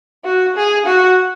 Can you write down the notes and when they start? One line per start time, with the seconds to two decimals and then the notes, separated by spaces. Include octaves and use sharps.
0.25 F#4
0.56 G#4
0.86 F#4